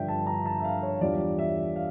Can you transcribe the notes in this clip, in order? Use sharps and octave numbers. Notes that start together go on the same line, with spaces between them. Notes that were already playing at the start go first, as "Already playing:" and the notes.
Already playing: G2 D3 F3 D5 E5 G5
A5
A#5
A5
E5
F5
C#5
E2 E3 G3 D4 F4 D5
E5
F5